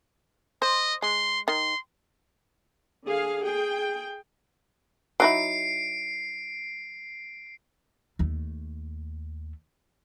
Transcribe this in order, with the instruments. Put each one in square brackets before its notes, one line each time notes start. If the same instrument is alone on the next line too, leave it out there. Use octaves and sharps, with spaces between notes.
[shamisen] C5 [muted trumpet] D#5
[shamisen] G#3 [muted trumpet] C6
[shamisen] D#3 [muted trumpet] C6
[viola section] D3 G#4 F5
G#4 G5
[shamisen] F#3 D#4 E4 [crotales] C7 D7
[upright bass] D#2 A3